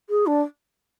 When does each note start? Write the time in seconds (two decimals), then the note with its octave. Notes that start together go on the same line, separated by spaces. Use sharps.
0.09 G#4
0.26 D4